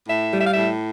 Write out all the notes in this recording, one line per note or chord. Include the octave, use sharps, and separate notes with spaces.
A2 E5
G3
E5
F5
A2 E5